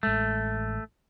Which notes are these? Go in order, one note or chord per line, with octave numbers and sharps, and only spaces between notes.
A1 G#3 A3